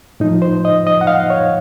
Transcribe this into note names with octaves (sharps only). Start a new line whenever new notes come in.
A2 F3 D#4
C5
D#5
D#5
F#5
F5
C#5